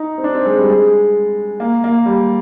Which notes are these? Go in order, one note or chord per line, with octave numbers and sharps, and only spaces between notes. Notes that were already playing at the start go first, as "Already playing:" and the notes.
Already playing: D#4
C4
D4
C4
G#3
G3
G#3
A#3
A#3
G3